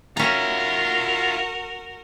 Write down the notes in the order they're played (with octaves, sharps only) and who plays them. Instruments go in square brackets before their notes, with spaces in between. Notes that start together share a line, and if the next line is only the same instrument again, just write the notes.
[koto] C#4 A#5 [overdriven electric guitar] F4 E5 [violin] F#4 A#4